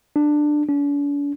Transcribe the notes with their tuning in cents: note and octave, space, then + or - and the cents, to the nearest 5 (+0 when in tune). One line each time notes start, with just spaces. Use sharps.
D4 +15
D4 -45